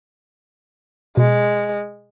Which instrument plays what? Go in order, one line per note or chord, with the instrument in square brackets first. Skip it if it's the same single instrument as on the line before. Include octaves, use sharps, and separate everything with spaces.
[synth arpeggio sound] B2 [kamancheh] G#3